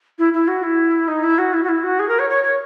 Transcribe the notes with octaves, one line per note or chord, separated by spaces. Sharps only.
E4
E4
F#4
E4
D#4
E4
F#4
E4
F#4
E4
F#4
G#4
A#4
C#5
C#5
C#5